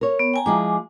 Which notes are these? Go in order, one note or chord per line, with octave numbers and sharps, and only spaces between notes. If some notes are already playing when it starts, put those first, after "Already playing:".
A#4 C#5
B3
G5 G#5 A#5
F3 G#3 E4 G#5 D6